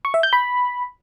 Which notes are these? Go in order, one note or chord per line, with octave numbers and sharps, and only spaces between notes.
C#6
E5
G6
B5